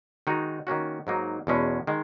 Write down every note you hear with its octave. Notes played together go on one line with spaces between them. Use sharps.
D#3 G#3 D#4 F#4
D#3 A#3 C#4 F#4
G#2 F#3 A#3 D#4
E2 B2 G#3 C#4
D#3 G#3